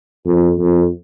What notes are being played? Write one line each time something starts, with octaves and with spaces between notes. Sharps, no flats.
F2
F2